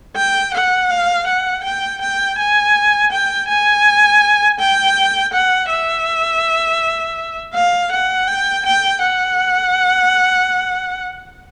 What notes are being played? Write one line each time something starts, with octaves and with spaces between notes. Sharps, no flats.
G5
F#5
F5
F#5
G5
G5
G#5
G5
G#5
G5
F#5
E5
F5
F#5
G5
G5
F#5